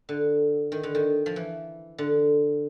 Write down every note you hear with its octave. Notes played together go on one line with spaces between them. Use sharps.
D3
D#3
D3
D#3
F3
E3
D3